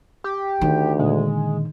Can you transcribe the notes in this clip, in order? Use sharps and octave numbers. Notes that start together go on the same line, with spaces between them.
G4
D2 D#3
A#2 D3 G#3